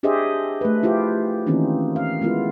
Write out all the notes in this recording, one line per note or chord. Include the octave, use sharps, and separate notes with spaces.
D4 G4 G#4 C5 D#5 E5
A3 B4
E4 F4 G4 C5
D#3 E3 A#3 C4 C#4 D#4
F5
G#3 B3 E4 F4 A#4